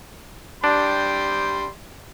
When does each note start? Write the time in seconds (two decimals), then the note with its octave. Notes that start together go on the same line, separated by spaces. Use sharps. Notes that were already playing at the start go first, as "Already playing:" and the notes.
0.64 G3 D4 G5 C6